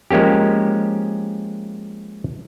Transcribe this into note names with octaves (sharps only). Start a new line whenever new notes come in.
F3 G#3 A#3 C#4 G4